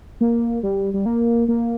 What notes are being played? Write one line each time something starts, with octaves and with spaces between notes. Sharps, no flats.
A#3
G3
G3
A#3
A#3